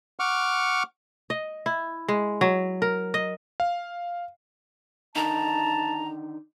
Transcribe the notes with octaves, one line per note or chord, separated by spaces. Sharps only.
F#5 C#6 D6 F6
D#5
E4
G#3
F#3
A#4
D#5
F5
D3 D#3 D#4 A5 A#5